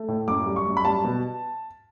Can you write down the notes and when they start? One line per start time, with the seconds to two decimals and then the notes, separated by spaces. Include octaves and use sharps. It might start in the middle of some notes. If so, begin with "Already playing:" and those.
Already playing: A3
0.08 A2
0.28 F#2 D6
0.46 G3
0.56 C#6
0.66 F#2
0.77 B5
0.85 G3 A5
1.05 B2